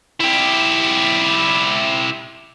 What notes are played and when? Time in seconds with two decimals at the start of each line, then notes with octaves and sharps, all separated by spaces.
0.20 E4 G4